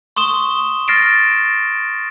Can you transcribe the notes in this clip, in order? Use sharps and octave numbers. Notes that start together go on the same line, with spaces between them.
C6 C#6 D#6 E7 G7
F6 A6 A#6 C7 D7 E7